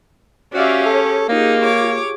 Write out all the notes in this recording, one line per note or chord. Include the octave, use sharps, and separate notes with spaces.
C#4 F#4 G4 D5 E5 F5
G#4 A4 C#5
A#3 D#4 F4 G4 G#4
C#5 D6